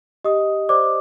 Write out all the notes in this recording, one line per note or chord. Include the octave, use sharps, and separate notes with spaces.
G4 D#5 D#6
C5 D5 D6